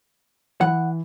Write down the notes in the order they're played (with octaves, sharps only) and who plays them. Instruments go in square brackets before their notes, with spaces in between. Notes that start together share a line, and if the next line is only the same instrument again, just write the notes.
[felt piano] E3 [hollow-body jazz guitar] F#5